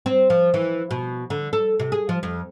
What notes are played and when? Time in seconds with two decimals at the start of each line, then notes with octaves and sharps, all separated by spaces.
0.06 C4
0.30 F3
0.54 E3
0.91 B2
1.30 D3
1.53 A4
1.80 C3
1.92 G#4
2.09 F3
2.23 F2